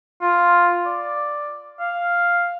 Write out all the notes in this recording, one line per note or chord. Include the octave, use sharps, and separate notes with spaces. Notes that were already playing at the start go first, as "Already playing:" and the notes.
F4
D5
F5